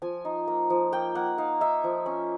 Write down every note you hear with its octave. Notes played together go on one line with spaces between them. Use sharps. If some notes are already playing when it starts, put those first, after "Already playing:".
F3 G#5
D#4
A#3
F3
A#3 G5
A#3 F#5
D#4 F5
D#4 E5
F3
C#4